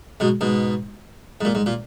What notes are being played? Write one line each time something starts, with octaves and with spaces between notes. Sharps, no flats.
G#2 B2
G#2 B2
G#2
A#2
G#2
A#2